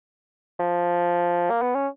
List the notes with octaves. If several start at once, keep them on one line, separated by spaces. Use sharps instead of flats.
F3
A#3
B3
C#4